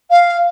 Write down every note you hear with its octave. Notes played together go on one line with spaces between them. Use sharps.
F5